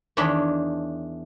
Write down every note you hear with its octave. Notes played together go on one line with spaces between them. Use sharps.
E2 D#3 D4 C#5 B5